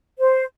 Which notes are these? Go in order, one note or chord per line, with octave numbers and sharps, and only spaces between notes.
C5